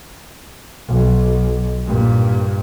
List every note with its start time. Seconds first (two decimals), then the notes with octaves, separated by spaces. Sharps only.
0.88 B1
1.86 G2 A#2